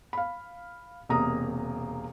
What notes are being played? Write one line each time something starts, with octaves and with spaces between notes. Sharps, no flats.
F5 B5
E1 C3 A#3 A#4 A#5 D#6